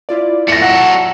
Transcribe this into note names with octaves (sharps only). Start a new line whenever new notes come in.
E4 F4 D5
E3 A3 A#6 C#7
F#3 A4 F#5